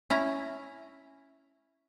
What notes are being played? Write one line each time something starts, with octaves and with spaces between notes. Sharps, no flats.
C#4 E4 A#5